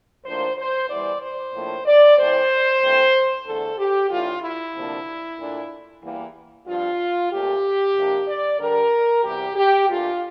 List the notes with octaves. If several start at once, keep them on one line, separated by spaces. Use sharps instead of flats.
A2 F3 A#3 D4 C5
C5
E2 E3 G3 D5
C5
A2 F3 A#3 D4
D5
A2 E3 A3 C4 C5
G2 E3 A3 C4
E2 D3 A3 A4
G4
A2 E3 A3 D4 F4
E4
D2 C3 F3 A#3 D4
A#2 A3 D4
E2 E3 G3 A#3
G2 F3 C4 F4
A#2 A3 C4 G4
F2 C3 F3 A#3 D4
D5
G2 D3 G3 A#4
E2 C3 G3 G4
G4
A#2 A3 D4 F4